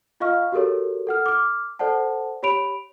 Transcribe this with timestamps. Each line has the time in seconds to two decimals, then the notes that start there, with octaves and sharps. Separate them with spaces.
0.20 F4 D#5 F5 C#6 F6
0.52 F#4 G4 A4 A#4 C#5
1.07 A4 F#5 F6
1.26 D6 F6
1.79 A4 C5 D5 F#5 A5
2.43 G4 C#5 B5 D7 F7